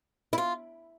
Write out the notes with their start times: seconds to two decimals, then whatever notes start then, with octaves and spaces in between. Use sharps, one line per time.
0.33 E4
0.38 F4